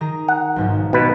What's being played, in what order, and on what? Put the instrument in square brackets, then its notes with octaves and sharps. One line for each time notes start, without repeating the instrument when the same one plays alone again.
[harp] D#3 G#4 A#5
[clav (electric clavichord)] F#5
[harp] B1 G#2 F3
[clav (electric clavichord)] B2 B4